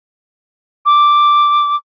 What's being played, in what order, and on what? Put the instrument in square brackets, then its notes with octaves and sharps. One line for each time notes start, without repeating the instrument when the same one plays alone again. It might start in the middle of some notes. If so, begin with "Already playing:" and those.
[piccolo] D6